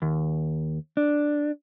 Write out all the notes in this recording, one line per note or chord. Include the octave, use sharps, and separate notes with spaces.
D#2
D4